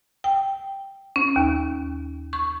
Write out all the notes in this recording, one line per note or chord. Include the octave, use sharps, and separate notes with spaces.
G5
C#4
D#2
C#6